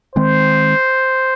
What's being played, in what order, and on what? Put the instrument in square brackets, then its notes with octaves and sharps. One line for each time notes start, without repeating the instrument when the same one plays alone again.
[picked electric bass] D#3 G#3 C4 [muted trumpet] C5